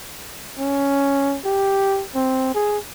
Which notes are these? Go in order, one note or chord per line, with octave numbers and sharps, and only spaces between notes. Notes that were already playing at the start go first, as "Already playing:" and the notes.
C#4
G4
C4
G#4